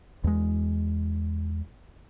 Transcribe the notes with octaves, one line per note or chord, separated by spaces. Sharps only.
E2 G#3